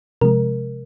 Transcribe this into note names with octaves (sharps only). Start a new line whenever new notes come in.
C3 F3 G#3 A#4